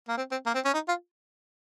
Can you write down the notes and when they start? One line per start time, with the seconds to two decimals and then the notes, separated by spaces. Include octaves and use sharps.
0.08 A#3
0.17 C4
0.31 C4
0.46 A#3
0.55 C4
0.65 C#4
0.74 D#4
0.88 F4